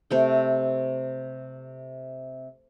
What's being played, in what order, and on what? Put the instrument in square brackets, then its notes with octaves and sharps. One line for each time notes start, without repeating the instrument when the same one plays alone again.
[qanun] C3 A3 G5